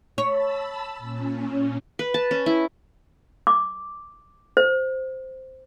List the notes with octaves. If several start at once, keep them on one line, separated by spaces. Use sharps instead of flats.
C#5 A5 B5 E6
A#2 C#4
B4
A5
C#4
E4
D6
C5